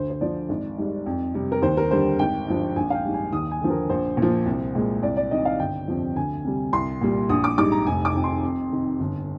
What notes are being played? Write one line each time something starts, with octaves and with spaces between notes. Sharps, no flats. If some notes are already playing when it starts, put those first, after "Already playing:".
Already playing: D2 C5
C5
D3 F3 D5
G#1
G#2 G3
F2
C3 G3
A#4
D#2 C5
A#4
D3 G3 C5
G#1 G5
G2 F3
A#1 G#5
F5
G5
G#2 G3
G#5
D#2 D#6
G#5
D3 F3
A#4
A#1 C5
A#2 F3
C2
A#2 G#3
C2 D5
D5
C3 D#3 D#5
F5
G1 G5
F2 C3 F3
D2 G#5
C3 G3
C2 C6
A#2 G3
A#1 D#6
D6
G#2 G3 D6
A#5
F1 G#5
D6
F2 D#3
C6
F2
C3 D#3
G1